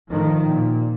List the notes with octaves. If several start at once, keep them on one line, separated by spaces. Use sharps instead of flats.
A2 D#3 F3
A#2